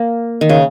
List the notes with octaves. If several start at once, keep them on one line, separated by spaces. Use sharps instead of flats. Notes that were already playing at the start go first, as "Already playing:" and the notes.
Already playing: A#3
D#3
C#3